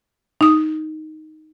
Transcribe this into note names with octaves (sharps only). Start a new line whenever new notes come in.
D#4 D#6